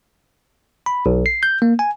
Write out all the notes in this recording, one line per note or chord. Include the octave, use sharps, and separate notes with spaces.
B5
B1
C7
G6
A#3
G#5